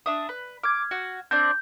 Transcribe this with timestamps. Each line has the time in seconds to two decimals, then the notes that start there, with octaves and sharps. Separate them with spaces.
0.06 D4 E5 D#6
0.29 B4
0.64 D6 F6 G#6
0.91 F#4
1.31 C4 D4 D5 G6